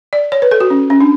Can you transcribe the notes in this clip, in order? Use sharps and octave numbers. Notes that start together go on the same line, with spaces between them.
D5
C#5
B4
A4
F#4
C#4
C#4
D4